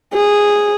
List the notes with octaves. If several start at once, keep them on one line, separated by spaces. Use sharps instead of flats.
G#4